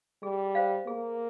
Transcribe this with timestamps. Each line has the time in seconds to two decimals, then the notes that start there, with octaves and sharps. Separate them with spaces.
0.22 G3 G#4
0.55 C5 F5
0.86 A#3 G#4